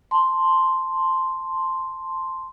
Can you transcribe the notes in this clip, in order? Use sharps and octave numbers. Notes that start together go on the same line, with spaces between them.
A5 C6